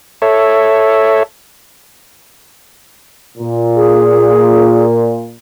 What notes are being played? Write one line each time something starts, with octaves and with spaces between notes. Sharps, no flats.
A4 C#5 E5
A#2
G#4